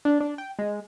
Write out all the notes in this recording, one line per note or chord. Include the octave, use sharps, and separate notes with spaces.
D4
D4
G5
G#3